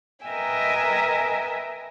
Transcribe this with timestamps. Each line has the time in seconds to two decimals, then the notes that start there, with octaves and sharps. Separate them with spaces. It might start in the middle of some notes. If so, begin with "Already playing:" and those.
0.25 A#4 B4 D#5 E5 G5 G#5